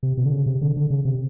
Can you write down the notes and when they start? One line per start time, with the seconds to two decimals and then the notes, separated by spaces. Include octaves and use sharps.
0.03 C3
0.17 B2
0.25 D3
0.32 C#3
0.46 C3
0.61 D3
0.76 D3
0.90 C#3
1.05 C3